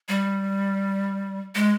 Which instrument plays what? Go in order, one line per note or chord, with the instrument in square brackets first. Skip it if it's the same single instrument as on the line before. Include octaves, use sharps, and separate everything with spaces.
[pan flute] G3
G#3